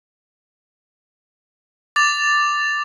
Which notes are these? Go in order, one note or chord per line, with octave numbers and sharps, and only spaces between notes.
D6 A6 F7